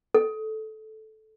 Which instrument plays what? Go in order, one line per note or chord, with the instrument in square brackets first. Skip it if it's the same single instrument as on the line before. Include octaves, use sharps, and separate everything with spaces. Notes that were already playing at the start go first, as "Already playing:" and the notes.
[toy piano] A4